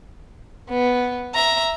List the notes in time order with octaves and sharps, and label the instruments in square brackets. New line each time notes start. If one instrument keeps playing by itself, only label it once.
[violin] B3
E5 A#5